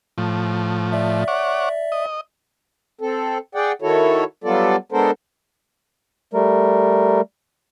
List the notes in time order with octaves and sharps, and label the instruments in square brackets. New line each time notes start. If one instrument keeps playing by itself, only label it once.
[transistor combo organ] A2 F3
[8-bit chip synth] D5 E5
[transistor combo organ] C#5 F#5 D6
D#5
[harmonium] C4 A4
G#4 D5 F#5 G5
D#3 E4 F#4 A4 C#5
F#3 G3 B3 F4 A4 D5
G#3 B3 D4 A4 A#4 C5
[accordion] G3 A3 A#4